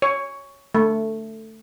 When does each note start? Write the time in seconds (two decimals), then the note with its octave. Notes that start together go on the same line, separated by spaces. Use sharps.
0.02 C#5
0.75 A3